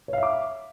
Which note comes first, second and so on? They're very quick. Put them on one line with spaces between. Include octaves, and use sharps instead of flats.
C#5 F5 E5 D6